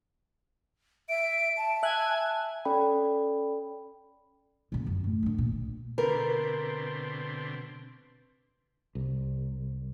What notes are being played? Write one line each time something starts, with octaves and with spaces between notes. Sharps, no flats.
E5 D7
A5
E5 G#5 F#6
C#4 A4 D5 G5 B5
A#2 C#3
F#2
A2
D3 E3
A#2
B2 D3 C4 A#4 B4
C2